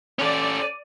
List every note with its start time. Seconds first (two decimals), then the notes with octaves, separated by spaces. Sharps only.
0.19 C#4 A4 D5